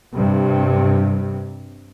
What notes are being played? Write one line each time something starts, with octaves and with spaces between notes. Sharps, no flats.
G2 C3